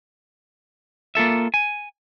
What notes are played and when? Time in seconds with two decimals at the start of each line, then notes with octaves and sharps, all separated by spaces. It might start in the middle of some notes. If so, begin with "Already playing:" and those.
1.15 A#3 F4 A4 E5
1.54 G#5